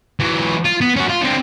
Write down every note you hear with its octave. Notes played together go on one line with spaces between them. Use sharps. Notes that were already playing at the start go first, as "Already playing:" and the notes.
E3 F#3
F4
B3
C#4 F#4
F4
D3 C4